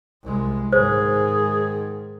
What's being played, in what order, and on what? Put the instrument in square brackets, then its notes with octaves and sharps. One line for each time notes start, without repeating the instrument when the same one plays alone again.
[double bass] C2 G#3
[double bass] G#2 D#3 [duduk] G#4 [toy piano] C5